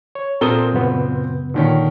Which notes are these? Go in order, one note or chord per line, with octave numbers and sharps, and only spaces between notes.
C#5
A#2 C4 A4 A#4 D#6 G7
F#2 C#3 B3
A#2 D3 D#3 C#4